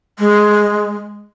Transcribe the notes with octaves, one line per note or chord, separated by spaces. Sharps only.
G#3